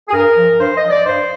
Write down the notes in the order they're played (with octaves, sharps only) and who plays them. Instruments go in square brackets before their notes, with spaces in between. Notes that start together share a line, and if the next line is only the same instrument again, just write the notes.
[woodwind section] G#4
G2 A#4
F3
G2 C5
D#5
F3
D5
G2 C5